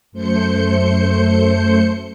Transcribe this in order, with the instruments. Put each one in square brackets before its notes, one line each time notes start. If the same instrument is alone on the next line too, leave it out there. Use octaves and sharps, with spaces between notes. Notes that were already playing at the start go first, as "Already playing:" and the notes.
[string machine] F#2 A3 C5 G6 C#7